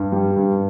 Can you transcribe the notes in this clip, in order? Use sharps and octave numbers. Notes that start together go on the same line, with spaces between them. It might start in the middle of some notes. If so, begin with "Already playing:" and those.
Already playing: G2
G3
G2